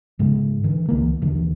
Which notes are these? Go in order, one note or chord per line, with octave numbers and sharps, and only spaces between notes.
G#2 C#3 G#3
D3 E3
C#2 E3 A#3
D#2 D3 E3